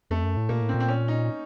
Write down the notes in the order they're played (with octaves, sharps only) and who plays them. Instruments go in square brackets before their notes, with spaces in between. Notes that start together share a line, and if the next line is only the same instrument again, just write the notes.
[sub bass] F2 [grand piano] A3
[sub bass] F#2
A2
[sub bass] A#2 [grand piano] A#3
[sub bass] A2
[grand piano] C4
[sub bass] A#2
[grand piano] C4
C#4
D#4